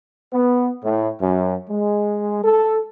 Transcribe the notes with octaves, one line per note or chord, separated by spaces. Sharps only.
B3
A2
F#2
G#3
A4